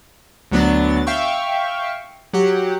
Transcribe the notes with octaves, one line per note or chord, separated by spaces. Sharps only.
D2 D3 F#3 B3 D4 A6
E5 F5 G5 C#6
F#3 G4 F#5